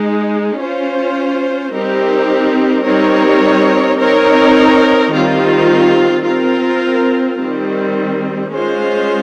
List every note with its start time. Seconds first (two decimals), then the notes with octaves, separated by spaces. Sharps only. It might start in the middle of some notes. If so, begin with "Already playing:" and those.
Already playing: G#3 D#4 G#4
0.58 C#4 F4 C5
1.72 G3 C4 D#4 G4 A#4
2.85 G3 C4 D#4 A#4 C#5
3.98 C4 D#4 A#4 C#5
5.11 D#3 G3 C4 F4
6.25 C4 F4 A#4
7.38 D#3 G3 C4
8.51 G#3 C#4 F4 C5